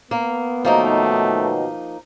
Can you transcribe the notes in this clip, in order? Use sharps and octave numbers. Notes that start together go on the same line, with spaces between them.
A#3 B3
B2 D#3 F3 F#3 A3 A#3 D#4